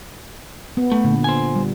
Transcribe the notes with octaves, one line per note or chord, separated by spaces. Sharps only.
B3
A3
A#2 D3
C5 G#5
G3